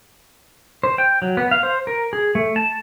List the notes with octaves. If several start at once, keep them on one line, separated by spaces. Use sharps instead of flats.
C5
G5
F#3
B3
F5
C5
A#4
G#4
A3
A5